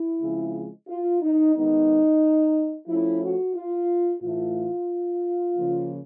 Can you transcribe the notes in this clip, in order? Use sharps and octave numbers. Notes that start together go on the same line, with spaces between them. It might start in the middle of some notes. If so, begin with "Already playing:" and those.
Already playing: E4
C#3 F3 G#3 C4
F4
D#4
D#3 G#3 B3 D#4
F3 A3 C#4 E4
F#4
F4
A2 E3 A3 F4
C#3 F3 A#3